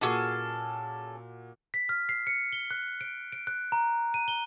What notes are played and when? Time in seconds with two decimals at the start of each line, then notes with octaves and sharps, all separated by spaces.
0.01 A#2 C#4 F#4 G#4 A4 D6
1.74 B6
1.89 F6
2.09 C7
2.27 C#7
2.53 G7
2.71 F#6
3.01 D7
3.32 D7
3.47 F#6
3.72 A#5
4.14 D#7
4.28 G7